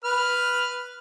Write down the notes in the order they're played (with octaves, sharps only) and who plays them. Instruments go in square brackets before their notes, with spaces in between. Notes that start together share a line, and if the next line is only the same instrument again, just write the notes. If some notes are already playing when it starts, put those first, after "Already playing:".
[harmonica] B4 F6